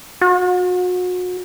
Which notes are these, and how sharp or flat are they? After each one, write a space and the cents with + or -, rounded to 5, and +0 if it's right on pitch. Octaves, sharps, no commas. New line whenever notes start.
F#4 -35